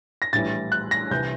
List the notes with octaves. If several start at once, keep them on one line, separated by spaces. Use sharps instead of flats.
A#6
A#1 A2 E3 G3 A6
F#6
A#6
C2 C3 E3 G6